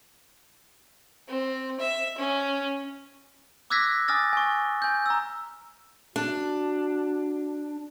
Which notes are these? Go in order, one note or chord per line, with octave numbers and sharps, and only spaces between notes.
C4
E5
C#4
D6 E6 F#6 G#6 A#6 B6
G#5 D6 D#6 F6 A6 A#6
G#5 C#6
G#5 G6
A#5 E6
D4 F#4